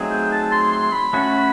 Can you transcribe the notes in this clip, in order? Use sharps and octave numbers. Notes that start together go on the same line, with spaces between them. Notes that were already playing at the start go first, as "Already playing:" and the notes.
Already playing: F#3 A3 C4 D#4 G#4
G5
A5
C6
C6
B5
A3 C#4 F#4